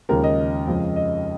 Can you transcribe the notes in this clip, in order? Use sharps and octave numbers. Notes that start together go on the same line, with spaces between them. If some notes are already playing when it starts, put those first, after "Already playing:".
D#2 C#3 F3 G#3 A#4
D#5
F2 C#3 F3 G#3
D#5